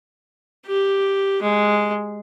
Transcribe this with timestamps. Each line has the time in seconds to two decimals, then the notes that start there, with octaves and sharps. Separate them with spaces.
0.67 G4
1.42 G#3